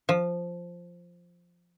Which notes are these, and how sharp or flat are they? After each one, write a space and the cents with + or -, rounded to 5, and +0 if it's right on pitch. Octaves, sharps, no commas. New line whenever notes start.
F3 +0